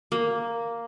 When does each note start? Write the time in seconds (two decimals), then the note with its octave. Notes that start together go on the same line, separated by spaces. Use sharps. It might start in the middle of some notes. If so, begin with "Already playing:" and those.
0.12 A#3